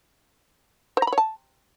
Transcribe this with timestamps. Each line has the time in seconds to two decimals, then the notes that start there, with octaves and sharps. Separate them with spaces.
0.97 C5
1.02 A#5
1.07 B5
1.12 C#5
1.18 A5